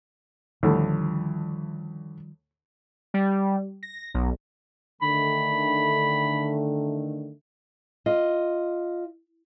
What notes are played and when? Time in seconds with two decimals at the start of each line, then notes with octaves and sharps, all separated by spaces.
0.63 D2 A2 D3 D#3 F3 G3
3.14 G3
3.83 A#6
4.14 B1
5.02 D3 D#3 A3 B5
8.06 F4 D#5